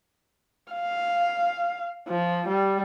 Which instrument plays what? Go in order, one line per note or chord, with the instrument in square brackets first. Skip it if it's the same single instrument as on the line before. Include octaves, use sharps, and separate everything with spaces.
[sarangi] F5
F3
G3